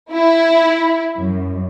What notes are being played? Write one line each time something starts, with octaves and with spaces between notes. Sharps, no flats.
E4
F#2